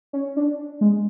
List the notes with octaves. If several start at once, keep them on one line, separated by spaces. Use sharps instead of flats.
C#4
D4
G#3